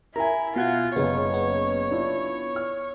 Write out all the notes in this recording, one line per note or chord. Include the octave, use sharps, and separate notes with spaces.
E4 A#4 G#5 A#5
B2 F4 F#5 G#6
F#1 C#3 B3 C#4 C#5
B3
D4 E4 F4
F6